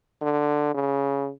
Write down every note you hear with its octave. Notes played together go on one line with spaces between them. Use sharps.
D3
C#3